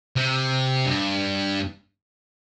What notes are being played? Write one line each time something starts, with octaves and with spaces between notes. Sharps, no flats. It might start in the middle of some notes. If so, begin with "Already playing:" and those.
C3
G2